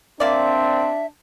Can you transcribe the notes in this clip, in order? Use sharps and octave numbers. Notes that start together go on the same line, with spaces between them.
A#3 C4 D4 D5 E5